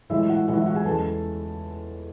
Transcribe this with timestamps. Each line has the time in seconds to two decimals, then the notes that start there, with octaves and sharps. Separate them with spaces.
0.10 A2 E3 G#3 E4 E5
0.28 F#4 F#5
0.48 A2 E3 G#3 F#4 F#5
0.56 E4 E5
0.66 F#4 F#5
0.76 G#4 G#5
0.85 E2 C#3 G#3 A4 A5